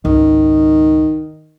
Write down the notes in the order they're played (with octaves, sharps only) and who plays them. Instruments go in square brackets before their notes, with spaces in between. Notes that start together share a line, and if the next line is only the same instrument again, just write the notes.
[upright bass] G#1 C#2 [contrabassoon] D#3